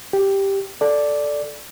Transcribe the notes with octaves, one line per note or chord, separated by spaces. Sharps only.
G4
A4 D5